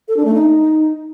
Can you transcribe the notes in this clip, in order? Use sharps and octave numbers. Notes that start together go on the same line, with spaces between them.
A4
D4
A3
D#4